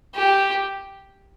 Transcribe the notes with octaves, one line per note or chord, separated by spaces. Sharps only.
G4